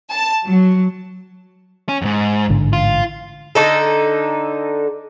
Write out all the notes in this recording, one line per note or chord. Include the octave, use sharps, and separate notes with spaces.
A5
F#3
C#4
F2 G#2
A1 G#2 D3
F4
D3 D#4 A4